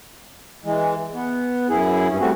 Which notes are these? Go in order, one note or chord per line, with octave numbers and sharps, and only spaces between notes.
E3 G#3
B3
F#2 E4 G#4
G2 C#4
G3 A3 C4 F#4